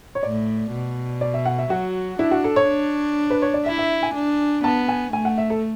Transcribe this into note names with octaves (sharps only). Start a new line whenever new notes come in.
C#5
A2 D5
B2
D5
E5
F#5
E5
F#3 F#4
D4 E4
F#4
A4
C#5
D4
B4
C#5
D5
E4 E5
E5
G#5
D4
B3 A5
G#5
A3 G#5
F#5
E5
A4